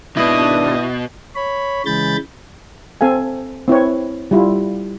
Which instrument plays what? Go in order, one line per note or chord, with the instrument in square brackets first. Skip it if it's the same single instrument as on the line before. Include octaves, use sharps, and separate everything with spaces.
[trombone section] G#1 D4 [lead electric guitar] B2 [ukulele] E4 [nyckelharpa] D#5
[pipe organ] C#5 B5
C#3 E3 G#3 B5 G6 A6
[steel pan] C4 A4 F5 G#5
C4 E4 B4 C#5
G3 E4 F4